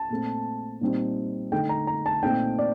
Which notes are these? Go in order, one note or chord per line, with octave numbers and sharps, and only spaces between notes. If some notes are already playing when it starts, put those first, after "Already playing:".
Already playing: A5
A#2 A3 C4
A#2 G3 C4 D#4
D3 A3 D#4 G5
A#5
A#5
A5
A#2 A3 C4 D#4 G5
D5